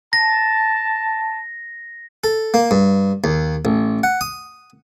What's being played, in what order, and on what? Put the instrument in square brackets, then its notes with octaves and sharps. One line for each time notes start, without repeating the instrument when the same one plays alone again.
[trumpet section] A5 [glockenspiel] A#6
[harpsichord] A4
A#3
G2
D#2
A1
F#5
D#6